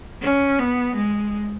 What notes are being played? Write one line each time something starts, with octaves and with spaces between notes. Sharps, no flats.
C#4
B3
G#3